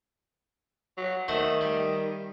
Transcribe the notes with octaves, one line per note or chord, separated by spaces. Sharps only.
F#3
D#3 A3 C5 F#5
G3